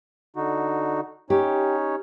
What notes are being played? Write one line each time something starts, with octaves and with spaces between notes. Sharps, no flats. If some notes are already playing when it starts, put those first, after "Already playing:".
D3 D#4 F#4
C#4 D#4 G4 C#5